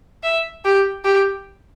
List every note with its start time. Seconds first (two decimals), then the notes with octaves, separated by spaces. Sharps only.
0.23 E5
0.65 G4
1.05 G4